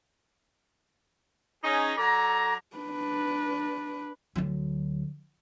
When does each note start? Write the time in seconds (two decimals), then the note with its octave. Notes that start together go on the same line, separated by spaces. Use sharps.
1.64 C#4 D#4 G#4
1.98 F#3 A4 D5 A#5
2.76 D4 B4
4.36 D2 F#3